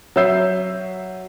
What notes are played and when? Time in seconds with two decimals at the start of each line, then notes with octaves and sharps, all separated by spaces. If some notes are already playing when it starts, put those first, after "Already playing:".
0.16 F#3 C#5 E5 E6 G6 C7